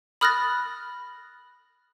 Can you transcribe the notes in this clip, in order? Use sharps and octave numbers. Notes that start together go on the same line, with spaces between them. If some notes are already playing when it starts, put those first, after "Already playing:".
B5 D#6 F6 F#6 A6 A#6